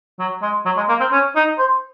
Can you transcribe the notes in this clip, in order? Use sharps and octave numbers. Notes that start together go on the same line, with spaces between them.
F#3
G#3
F#3
G#3
A#3
C4
C#4
D#4
C5